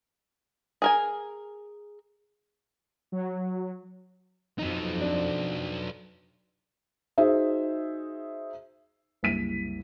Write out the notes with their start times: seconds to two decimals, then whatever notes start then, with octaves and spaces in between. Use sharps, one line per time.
0.82 G#4 A#4 G#5
3.12 F#3
4.59 F2 F#3 D#4
5.01 D4
7.18 D#4 F#4 G#4 C5 E5
9.23 F#1 C2 B6 D#7